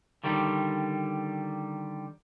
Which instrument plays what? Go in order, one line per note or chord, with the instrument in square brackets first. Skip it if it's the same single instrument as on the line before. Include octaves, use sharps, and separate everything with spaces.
[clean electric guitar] D3 D#3 G3